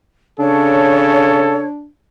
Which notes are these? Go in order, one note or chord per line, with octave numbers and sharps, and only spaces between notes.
C#3 D4 A4 C#5